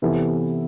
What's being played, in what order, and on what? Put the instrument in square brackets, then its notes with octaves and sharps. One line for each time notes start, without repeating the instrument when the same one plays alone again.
[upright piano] C3 E3 B3 E4 A4